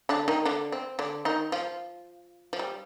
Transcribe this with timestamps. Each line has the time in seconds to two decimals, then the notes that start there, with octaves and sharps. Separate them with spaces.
0.09 D3 D4
0.28 D#3 D#4
0.45 D3 D4
0.72 C4
0.99 D3 D4
1.25 D#3 D#4
1.52 F3 F4
2.53 F3
2.59 G3